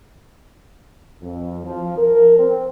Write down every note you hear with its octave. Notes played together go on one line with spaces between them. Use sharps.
F2
F3
A#4
C4